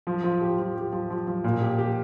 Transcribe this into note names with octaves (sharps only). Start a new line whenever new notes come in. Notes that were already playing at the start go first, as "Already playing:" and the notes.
F3
F3
G4
F3
G4
F3
F3
F3
A#2
G4
G4